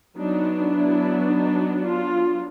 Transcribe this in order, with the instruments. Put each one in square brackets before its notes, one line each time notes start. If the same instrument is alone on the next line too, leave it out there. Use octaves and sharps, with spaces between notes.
[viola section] F#3 B3 D4 D#4
E4
D#4
F4